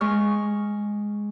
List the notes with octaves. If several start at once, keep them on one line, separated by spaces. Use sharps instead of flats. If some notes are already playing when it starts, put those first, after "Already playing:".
G#3 C#6 F6